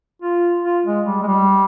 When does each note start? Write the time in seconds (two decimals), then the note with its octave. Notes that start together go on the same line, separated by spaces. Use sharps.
0.22 F4
0.64 F4
0.86 G#3
1.06 G3
1.22 G#3
1.27 G3